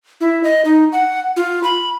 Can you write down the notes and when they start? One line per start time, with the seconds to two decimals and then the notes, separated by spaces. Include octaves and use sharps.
0.21 E4
0.44 D#5
0.65 D#4
0.92 F#5
1.36 F4
1.64 B5